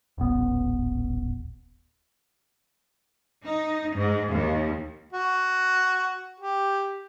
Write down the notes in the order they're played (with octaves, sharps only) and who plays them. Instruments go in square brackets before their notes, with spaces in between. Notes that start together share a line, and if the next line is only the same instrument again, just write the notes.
[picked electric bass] D#1 A1 B3
[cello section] D#4
G#2
D#2
[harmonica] F#4
G4